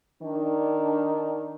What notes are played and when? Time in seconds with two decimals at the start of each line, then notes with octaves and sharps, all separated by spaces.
0.22 D#3 D4